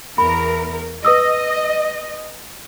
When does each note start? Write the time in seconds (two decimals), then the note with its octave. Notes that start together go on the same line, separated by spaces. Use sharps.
0.18 E2 A#4 B5
1.05 B4 D#5 D#6 E6